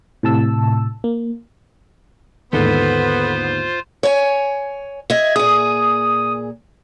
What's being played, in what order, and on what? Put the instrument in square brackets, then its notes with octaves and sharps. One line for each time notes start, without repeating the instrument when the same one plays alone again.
[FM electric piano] A2 C3 A5 E6
A#3
[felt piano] D#2 G#2 D3 [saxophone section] B3 [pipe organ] F4 C5 [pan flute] A4
[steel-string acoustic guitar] C#5 G#5
[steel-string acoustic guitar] D#5 E5 [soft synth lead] G#6
[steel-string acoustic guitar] A#2 G#4 [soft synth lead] D#6